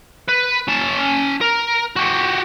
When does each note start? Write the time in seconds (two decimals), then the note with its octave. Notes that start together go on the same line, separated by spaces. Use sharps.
0.28 B4
0.68 C#4 A5
1.41 A#4
1.96 F#4 G4